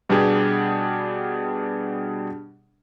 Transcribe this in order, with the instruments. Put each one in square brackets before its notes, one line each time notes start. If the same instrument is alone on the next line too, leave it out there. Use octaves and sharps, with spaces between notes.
[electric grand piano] B2 G3 B3 D4 G4 G#4